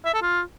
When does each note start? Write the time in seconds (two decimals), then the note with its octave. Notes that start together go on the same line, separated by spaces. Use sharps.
0.05 E5
0.14 A4
0.22 F4